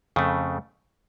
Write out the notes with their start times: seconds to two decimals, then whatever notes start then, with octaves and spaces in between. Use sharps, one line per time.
0.16 F2 C#3 A3